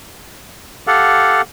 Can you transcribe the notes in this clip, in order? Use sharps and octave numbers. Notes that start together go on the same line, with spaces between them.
G4 A4 F5 F#5